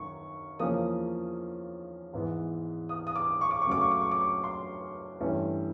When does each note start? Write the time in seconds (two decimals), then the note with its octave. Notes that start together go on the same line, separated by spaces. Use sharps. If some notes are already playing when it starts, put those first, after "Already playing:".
Already playing: F#2 D#3 C#6
0.59 E2 C#3 F3 A#3 C#4 D#6
2.13 G#2 E3 G#3 B3
2.89 D#6
3.07 D#6
3.16 D6
3.41 C#6
3.51 D6
3.62 C#6
3.67 F#2 C#3 F#3 A3 C#4 D6
3.81 C#6
3.91 D6
4.01 C#6
4.11 D6
4.21 C#6
4.44 C6
5.20 G2 E3 A3 C#4